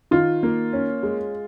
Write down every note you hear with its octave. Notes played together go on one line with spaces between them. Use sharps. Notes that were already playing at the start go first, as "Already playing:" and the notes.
D#3 F4
A#3
C#4
G#3